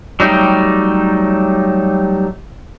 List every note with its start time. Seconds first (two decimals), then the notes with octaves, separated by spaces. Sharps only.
0.20 F#3 G3 A3 D#4 G4